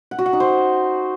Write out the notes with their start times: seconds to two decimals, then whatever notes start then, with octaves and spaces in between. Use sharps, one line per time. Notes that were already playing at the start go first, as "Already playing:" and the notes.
0.11 F#5
0.19 F#4
0.26 F#5
0.33 D#4
0.40 C5